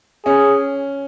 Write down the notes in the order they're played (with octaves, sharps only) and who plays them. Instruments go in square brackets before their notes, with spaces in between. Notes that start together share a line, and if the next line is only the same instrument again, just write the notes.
[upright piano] C#4 [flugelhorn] G#4